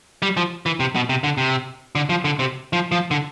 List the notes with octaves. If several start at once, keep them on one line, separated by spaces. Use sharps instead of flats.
G3
F3
E3
C3
B2
C3
D3
C3
D3
F3
D3
C3
F3
F3
D3